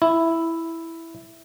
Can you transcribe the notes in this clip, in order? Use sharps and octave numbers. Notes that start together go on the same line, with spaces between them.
E4